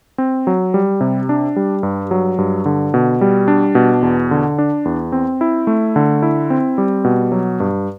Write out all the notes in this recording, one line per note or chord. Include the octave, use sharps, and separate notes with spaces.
C4
F#3
G3
C3
D4
G3
G2
F#3
G2
D3
B2
G3
D4
B2
E2
D3
D4
E2
C4
E4
A3
D3
E4
C4
G3
B2
F#3
G2